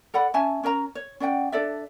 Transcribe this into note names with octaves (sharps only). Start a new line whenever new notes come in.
A4 D5 F#5 B5
C#4 E5 G#5 A5
C#4 A#4 D#5 A#5
C#5
C#4 D5 F#5 G5
D4 A4 D5 E5